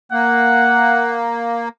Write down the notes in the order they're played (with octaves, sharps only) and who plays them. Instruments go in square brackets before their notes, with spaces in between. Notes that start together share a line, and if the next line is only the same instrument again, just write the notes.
[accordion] A#3 [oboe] F#5